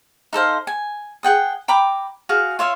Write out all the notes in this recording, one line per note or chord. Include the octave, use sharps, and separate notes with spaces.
D#4 A4 C5 F5
G#5
G#4 F#5 G5 D#6
G5 A#5 B5 D6
F#4 G#4 F5
F4 C#5 E5 F5